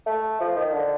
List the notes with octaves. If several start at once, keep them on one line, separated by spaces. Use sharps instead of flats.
A3
F3
D#3
D3